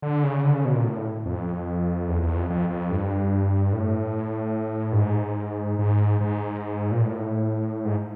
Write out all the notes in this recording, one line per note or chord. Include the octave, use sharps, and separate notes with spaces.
D3
C#3
D3
C#3
B2
A#2
A2
F2
E2
E2
F2
F2
F2
G2
A2
G2
G#2
G#2
G#2
A#2
A2
G#2